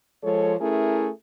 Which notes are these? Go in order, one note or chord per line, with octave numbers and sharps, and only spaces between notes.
F3 G#3 A4 C#5
A3 C#4 E4 G#4 A#4